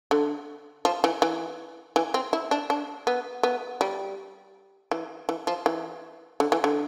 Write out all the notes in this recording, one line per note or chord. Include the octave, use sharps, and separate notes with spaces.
D3
F3
E3
E3
E3
C4
E4
D4
D4
B3
B3
G3
E3
E3
F3
E3
D3
E3
D3